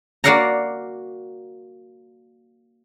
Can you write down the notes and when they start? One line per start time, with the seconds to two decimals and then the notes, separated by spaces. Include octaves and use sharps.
0.24 A#3 F#4 D5 F5 F#5 A#5